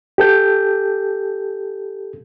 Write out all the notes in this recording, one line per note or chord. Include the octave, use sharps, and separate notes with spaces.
G4 A4 G6